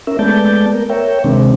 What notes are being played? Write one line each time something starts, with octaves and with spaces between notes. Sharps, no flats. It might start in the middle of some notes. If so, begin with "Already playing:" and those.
C#4 A#4 E5
G#3 A3 B3 D5 A5 G6
A#4
A#4 C#5 E5 G5
C3 D#3 G#3 C4 D4